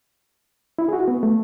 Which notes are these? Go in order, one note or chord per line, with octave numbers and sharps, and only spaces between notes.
E4
G#4
F#4
B3
A3